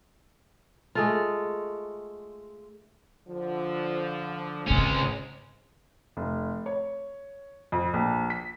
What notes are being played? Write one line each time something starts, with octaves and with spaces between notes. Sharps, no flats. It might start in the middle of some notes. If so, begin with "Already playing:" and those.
G#3 A3 F4
D3 F3
G#1 C#2 C#3 G#3 C4 C#4
F1
C#5
F2
A#1
B6